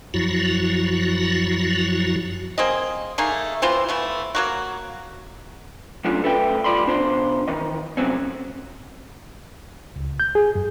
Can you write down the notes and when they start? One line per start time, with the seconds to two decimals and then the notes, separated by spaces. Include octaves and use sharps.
0.14 F#2 F3 F#3 E4 F#4
2.58 A#3 C4 G#4 D#5
3.18 A3 A#3 D#4 G#4
3.62 E3 C4 F4 C5
3.89 E3 A3 B3
4.35 F#3 A#3 F#4
6.05 F#3 G3 A3 C#4 D4 F4
6.23 D2 A4 B4 D5 E5 G5
6.64 D2 G3 F4 D5 B5 C6
6.86 B2 D4 C5 C6
7.48 D#3 E3 D#5
7.97 F2 C3 D#3 F#3 C4 C#4
9.96 C#2
10.20 G6
10.35 G#4
10.55 F#2